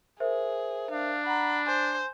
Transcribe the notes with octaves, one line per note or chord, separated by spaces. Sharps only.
G#4 A#4 C5 E5
D4 F5
F#5 A#5 B5
C5 G#5